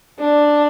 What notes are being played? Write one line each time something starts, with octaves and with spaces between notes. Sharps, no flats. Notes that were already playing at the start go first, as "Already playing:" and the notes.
D4